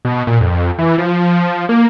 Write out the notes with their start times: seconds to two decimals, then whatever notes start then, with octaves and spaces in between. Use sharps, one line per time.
0.05 B2
0.27 A#2
0.41 F2
0.79 E3
0.98 F3
1.69 A#3